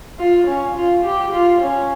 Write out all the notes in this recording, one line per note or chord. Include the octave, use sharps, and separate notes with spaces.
F4
C#4
F4
G4
F4
C#4